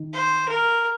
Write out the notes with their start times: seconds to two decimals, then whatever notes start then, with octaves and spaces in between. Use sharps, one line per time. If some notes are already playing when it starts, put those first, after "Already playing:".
Already playing: D#3
0.14 C5
0.49 A#4